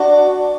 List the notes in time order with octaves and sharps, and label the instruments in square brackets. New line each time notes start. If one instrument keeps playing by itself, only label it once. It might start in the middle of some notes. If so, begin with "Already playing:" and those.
Already playing: [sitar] D4 F#4